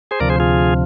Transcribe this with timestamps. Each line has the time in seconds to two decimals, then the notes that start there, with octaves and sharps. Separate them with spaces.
0.11 G#4 C5
0.20 D2 C3 F3 A#4 D5
0.30 G#4 C5
0.40 F4 G#4